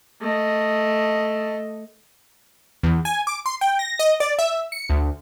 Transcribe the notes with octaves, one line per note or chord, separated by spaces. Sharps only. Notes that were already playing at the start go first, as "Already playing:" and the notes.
A3 D#5
E2
G#5
D6
C6
G5
A#6
D#5
D5
E5
C#7
D2